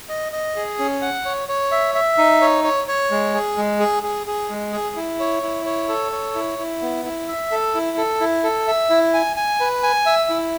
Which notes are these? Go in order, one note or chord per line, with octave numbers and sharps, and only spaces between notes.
D#5
D#5
G#4
C#4
F#5
C#5
C#5
E5
E5
D#4
C#5
C#5
C#5
G#3
G#4
G#3
G#4
G#4
G#4
G#3
G#4
E4
C#5
E4
C#5
A4
C#5
E4
E4
B3
E4
E5
A4
E4
A4
E4
A4
E5
E4
G#5
G#5
B4
G#5
E5
E4